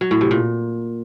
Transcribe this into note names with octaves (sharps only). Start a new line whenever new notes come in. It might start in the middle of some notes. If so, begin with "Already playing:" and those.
F#3
A2
C3
A#2